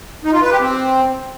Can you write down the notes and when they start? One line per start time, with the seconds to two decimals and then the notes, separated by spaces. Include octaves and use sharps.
0.24 D#4
0.33 F4
0.42 B4
0.51 G4
0.60 C4